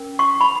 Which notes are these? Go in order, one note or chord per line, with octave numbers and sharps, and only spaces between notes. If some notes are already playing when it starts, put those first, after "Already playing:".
Already playing: C#4 A#4
C#6
B5